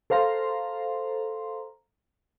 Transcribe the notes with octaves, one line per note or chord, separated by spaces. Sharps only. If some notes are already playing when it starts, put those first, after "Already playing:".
A4 C5 F5 A#5 C6